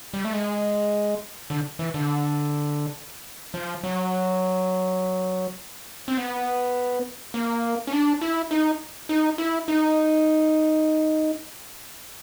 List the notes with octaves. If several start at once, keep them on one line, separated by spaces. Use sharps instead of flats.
G3
A3
G#3
D3
E3
D3
F3
F#3
C4
B3
A#3
C#4
D4
E4
D#4
D#4
E4
D#4